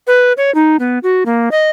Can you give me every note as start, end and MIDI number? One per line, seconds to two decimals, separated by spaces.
0.07 0.33 71
0.37 0.53 73
0.55 0.77 63
0.79 0.99 59
1.03 1.24 66
1.26 1.49 58
1.51 1.71 75